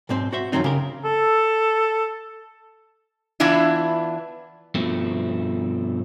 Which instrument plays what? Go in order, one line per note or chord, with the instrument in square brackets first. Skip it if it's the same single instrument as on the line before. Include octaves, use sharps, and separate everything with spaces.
[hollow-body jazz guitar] B1 G#2 C4 C5
F#4 C5 E5
F#2 D#3 F3 F#3 C4 D#4
C#3 G4 A#4
[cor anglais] A4
[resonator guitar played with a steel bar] E3 B3 D4 E4 F4
[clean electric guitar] G2 B2 F3 A3 C4